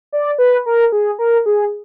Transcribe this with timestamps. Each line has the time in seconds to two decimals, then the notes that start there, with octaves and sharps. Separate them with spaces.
0.12 D5
0.38 B4
0.66 A#4
0.92 G#4
1.19 A#4
1.46 G#4